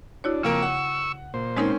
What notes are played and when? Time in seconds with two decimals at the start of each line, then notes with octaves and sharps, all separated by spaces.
0.24 D4 E4 F#4 C#5
0.43 F2 C#3 A#3 A#4 C#6 E6
0.63 F#5
1.34 A#2 C5
1.57 G#3 C4 C#4 D#4 A#4